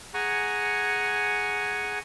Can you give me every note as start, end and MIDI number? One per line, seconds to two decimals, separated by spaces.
0.14 1.99 68
0.14 1.99 78
0.14 1.99 80
0.14 1.99 82
0.14 1.99 85